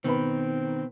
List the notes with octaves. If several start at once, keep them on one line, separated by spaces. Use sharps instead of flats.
B2 D#3 C4 B4 B5